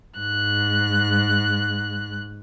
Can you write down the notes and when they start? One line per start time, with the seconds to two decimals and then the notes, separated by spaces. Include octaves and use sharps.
0.19 G#2 F#6